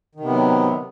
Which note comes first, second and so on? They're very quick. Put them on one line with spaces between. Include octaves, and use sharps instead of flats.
D#3 C3 B3 F#3